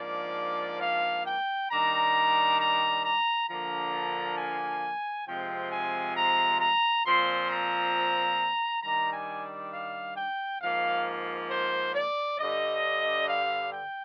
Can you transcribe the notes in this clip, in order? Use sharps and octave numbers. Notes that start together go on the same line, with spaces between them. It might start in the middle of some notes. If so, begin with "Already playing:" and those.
Already playing: G#2 F3 A#3 D4 D5
F5
G5
D#3 G3 D4 A#5
A#5
A#5
D3 F3 A#3 D4 A#5
G#5
C3 F3 G#3 C4 G5
G#5
A#5
A#5
A#2 F3 C4 C6
A#5
D#3 G3 D4 A#5
G#5
F5
G5
G#2 F3 A#3 F5
C5
D5
G2 D3 G3 D#5
F5
G5